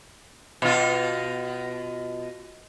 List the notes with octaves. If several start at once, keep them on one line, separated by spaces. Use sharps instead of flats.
B2 F4